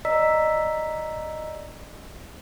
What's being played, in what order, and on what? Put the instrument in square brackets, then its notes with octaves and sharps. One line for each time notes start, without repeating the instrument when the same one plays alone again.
[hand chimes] D5 D#5 A#5 E6 B6